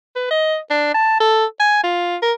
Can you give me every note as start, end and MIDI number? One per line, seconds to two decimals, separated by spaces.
0.16 0.28 71
0.31 0.57 75
0.71 0.93 62
0.94 1.17 81
1.20 1.45 69
1.60 1.83 80
1.83 2.16 65
2.22 2.33 70